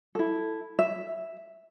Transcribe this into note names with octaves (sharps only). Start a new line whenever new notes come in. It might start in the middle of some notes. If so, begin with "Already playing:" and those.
E4 A4
E5